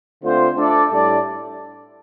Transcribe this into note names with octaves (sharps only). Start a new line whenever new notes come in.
D3 A3 C4 F4 C5
A3 D4 A4 D5
A2 G3 D4 A4 D5